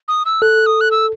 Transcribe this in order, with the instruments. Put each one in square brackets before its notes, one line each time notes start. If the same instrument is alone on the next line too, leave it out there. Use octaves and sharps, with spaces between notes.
[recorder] D#6
E6
[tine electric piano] A4 [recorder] F#6
[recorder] D#6
F#6
E6